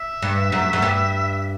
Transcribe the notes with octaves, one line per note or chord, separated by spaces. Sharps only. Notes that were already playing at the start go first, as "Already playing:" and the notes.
Already playing: E5
G2
F#2
F#2
G2